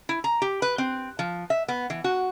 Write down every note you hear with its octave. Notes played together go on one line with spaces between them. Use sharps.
E4
A#5
G4
B4
C4
F3
E5
B3
E3
F#4